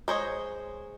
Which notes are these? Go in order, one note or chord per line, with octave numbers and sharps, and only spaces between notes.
G#3 C5 C#5 D#5